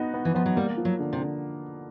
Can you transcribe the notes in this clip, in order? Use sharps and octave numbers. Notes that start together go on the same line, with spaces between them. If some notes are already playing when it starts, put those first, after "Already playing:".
Already playing: B3 D#4 F#4
B3
E3
F3 B3
F#3
G3 A#3
F3
F#3
D3
C3
D3